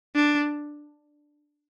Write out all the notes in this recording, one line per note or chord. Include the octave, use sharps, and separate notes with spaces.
D4